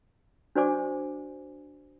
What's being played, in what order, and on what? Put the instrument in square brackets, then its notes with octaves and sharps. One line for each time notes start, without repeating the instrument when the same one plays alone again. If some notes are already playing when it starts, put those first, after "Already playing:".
[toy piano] D4 F#4 C5 D5 G#5 D6